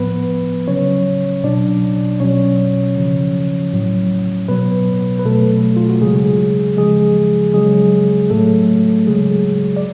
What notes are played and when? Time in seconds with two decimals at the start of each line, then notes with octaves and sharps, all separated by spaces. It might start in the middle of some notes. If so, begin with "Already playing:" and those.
Already playing: A2 F3 B3 B4
0.68 C#3 F#3 C#4 C#5
1.44 B2 F#3 D4 D5
2.20 B2 F#3 C#4 C#5
2.97 C#3 F3
3.73 A2 F#3
4.48 B2 F#3 B3 B4
5.19 B4
5.25 B2 F#3 A3 A4
5.76 F4
5.89 F#4
6.01 C#3 F#3 G#3 G#4
6.77 C#3 F3 G#3 G#4
7.54 C#3 F#3 G#3 G#4
8.30 A2 F#3 A3 A4
9.07 C#3 F#3 G#3 G#4
9.76 D5